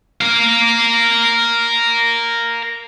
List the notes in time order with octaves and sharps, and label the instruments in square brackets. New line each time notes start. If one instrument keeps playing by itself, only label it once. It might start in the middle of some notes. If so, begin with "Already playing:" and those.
[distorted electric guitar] A#4 F5